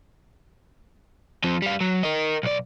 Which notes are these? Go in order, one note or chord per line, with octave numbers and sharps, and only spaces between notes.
F3 C4
G3 F5
F#3
A#4 D#5
B1 D5